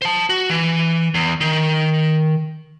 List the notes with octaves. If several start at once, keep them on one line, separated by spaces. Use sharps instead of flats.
C5 A5
F#4
E3
E2
D#3